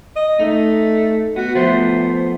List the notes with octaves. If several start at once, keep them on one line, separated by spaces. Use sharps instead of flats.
D#5
A3 D#4
B3 F#4
F3 A3 B3 C5